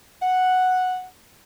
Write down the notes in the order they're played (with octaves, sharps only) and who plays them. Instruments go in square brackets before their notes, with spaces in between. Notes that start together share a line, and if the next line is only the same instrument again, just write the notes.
[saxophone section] F#5